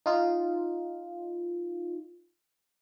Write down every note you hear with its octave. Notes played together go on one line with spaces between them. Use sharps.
D#4 F4